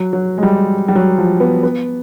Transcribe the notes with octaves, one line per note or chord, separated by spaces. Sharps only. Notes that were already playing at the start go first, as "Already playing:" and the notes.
Already playing: F#3
F#3
G#3
G3
G3
F#3
F3
B3
B3